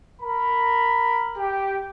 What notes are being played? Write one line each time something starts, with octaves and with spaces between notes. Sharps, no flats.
A#4 B5
G4